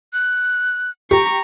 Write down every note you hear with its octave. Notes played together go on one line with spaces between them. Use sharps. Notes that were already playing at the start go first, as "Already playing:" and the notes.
F#6
G4 A#5 C#6